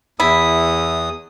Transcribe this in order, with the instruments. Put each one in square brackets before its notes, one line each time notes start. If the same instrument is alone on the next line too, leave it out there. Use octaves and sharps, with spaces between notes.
[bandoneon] E2 D#6 [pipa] E4